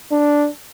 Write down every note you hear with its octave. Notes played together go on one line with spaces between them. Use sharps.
D4